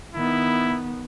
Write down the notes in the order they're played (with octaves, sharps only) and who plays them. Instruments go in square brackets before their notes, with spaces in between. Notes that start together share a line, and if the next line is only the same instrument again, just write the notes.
[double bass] D#3 B3 [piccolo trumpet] E4